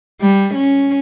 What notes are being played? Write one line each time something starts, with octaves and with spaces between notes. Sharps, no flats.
G3
C#4